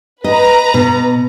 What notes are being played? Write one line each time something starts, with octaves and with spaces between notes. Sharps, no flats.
B4 D#5 A#5
B2